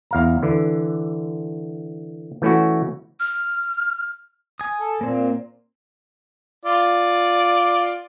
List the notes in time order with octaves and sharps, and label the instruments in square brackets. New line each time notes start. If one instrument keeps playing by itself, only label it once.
[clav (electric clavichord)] E2 F5 A#5
D3 E3
E3 A3 C#4 E4 F#4
[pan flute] F6
[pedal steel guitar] G#5 D#6
[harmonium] A4
[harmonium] A#2 [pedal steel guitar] A#3 C4
[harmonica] F4 D5